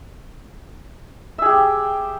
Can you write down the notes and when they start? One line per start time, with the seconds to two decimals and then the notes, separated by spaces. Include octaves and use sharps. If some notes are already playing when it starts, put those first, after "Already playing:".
1.38 E5
1.42 G#4
1.46 G4